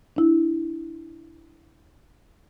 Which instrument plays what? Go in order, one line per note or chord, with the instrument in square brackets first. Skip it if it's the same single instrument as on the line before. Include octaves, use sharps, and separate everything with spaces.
[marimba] D4 E4